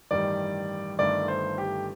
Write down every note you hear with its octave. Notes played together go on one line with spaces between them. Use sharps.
A1 G2 D#3 G3 D5
G1 G2 D#3 A3 D5
C5
G4